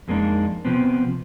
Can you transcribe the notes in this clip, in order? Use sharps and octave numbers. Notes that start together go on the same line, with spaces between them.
F2 G#3 A#3 C4 D4 D#4
C3 F3 B3 C4